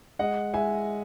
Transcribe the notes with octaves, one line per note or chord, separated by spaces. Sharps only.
G#3 D#5 F#5
G#3 E5 G#5